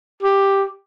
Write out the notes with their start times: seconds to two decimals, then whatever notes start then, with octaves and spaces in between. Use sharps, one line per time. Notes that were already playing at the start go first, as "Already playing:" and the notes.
0.23 G4